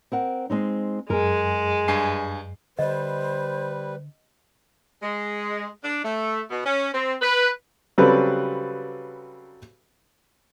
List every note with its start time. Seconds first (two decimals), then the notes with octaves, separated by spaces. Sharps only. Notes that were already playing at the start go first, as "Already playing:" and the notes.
0.12 C4 A#4 F#5
0.50 G#3 C4 D#4
1.10 F#2 G#3 G#4 A#4
1.88 G2 G#5 C7
2.79 D3 G3 B4 C5 D#5
5.02 G#3
5.83 D4
6.04 A3
6.50 B2
6.65 C#4
6.93 C4
7.22 B4
7.98 C#3 F#3 G3 C4 A4 B4